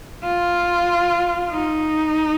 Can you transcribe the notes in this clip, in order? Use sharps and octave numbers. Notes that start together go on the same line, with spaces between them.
F4
D#4